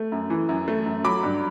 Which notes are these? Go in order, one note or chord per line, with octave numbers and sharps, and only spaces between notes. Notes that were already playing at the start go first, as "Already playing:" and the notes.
Already playing: A3
F#2
E3
F#2
A3
F#2
F#3 B5 D6
G2